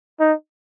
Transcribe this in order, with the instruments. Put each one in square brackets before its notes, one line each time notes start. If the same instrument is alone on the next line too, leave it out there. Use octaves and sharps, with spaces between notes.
[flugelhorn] D#4